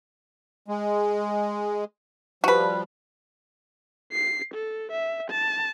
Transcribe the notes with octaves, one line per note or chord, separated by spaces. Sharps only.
G#3
F3 G3 F#4 B4
C7
A4
E5
A5